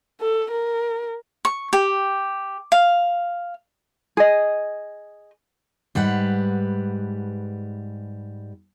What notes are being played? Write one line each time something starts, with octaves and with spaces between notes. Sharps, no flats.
A4
A#4
C#6
G4
F5
G#4 D#5
G#2 G3 B4 F#5